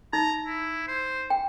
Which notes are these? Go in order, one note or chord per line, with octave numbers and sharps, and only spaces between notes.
D#4 A#5
E4
C5
G5